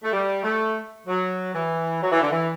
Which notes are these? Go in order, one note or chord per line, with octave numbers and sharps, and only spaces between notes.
A3
G3
A3
F#3
E3
F#3
E3
D3
E3